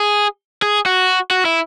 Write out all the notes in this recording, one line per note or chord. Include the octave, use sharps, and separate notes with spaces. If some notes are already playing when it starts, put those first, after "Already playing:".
Already playing: G#4
G#4
F#4
F#4
E4